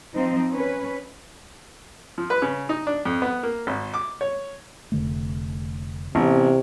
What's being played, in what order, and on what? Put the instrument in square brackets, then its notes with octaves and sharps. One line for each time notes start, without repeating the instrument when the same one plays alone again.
[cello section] F3 C4 D#4
C#4 B4
[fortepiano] F3
B4
C#3
D#4
D4
F2
B3
A#3
G#1
D6
C#5
[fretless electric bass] F1 D3 A3
[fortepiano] A1 [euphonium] C3 [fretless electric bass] B3 C#4